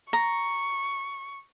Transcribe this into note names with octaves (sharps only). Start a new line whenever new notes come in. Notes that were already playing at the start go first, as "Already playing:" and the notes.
A#5 C#6